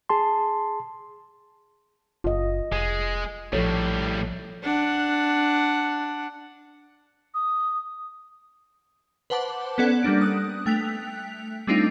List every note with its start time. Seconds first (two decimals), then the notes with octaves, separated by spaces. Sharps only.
0.09 G#4 A5 C6
2.24 F#1 F4 D#5
2.72 F1 G#3
3.53 A#1 A2 F3 G3 A4 C#5
4.63 D4 F#5
7.34 D#6
9.30 B4 C5 F#5 A5 D6
9.78 B3 C#4 A4 D5 F#5
10.03 G3 A#3 D4 D7
10.21 D#6 F#6
10.66 A3 G5 F#6 B6 F7
11.67 G3 A3 C4 D4 D#4 F4